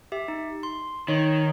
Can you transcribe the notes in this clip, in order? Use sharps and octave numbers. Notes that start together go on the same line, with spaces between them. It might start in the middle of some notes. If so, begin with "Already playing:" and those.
G4 E5
D#4
C6
D#3 C#5